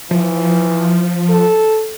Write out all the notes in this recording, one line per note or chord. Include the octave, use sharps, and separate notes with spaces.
E3 F3
A4